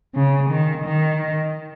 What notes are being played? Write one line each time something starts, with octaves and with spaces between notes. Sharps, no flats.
C#3
D#3
D#3